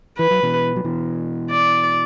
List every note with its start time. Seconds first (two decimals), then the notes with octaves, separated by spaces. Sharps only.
0.19 E3 B4
0.30 F#3
0.43 B2 E3
0.76 F#3
0.84 B2 E3
1.50 D5